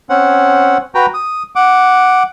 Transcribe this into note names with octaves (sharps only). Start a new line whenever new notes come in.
C4 C#4 F#5
F#4 B4 G5 A#5
D#6
F#5 D6